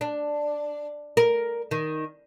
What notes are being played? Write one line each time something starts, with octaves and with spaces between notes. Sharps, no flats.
D4
A#4
D#3